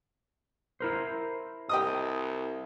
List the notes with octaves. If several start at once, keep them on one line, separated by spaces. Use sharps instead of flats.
E4 A#4 C5
C2 G4 D#5 D#6